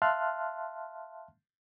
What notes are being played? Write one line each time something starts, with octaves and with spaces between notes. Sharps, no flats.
E5 F5 A5 C6 F6 F#6